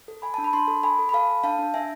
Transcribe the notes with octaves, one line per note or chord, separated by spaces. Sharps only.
A4
A4 G#5 B5
D4 A5
B5
D4 A5 C6
A4
A4 G#5 B5
A4
B5
A4 F5 A5
A4
D4 F5 A5
D4
D4 E5 G#5